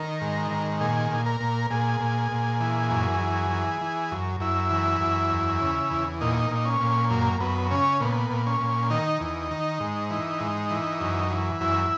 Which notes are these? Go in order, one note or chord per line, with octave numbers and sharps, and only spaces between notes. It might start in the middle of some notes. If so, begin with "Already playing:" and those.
Already playing: D#3 A#4
G#2
D#3
A#2 G#4
A#2
A#4
A#2
A#2 G#4
A#2
A#2
E3
F#2
E3
E3
E3
F#2
F#2 E4
E3
F#2
E2
C#3
E2
A#2 D#4
A#2 D#4
C#4
A#2
F#2 A#3
F#2 B3
C#3 C#4
A#2 B3
A#2
C#4
A#2
D#3 D#4
E2
D#3
G#2
E3
G#2
E3
F#2
E3
F#2 E4